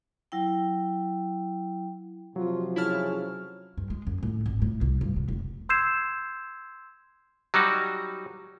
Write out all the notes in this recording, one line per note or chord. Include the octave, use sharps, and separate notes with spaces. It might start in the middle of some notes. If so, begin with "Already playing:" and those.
F#3 E4 G5
C3 F3 F#3 F4
C#3 E4 A5 F6
G2
G#3
F#2
A2
G#1
A2
C2
G2
C3
F1
C6 E6 G6 G#6 C7 E7
F#3 G3 D#4 F#4